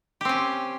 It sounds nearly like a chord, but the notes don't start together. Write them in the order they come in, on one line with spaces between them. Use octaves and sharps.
G4 C4 C#4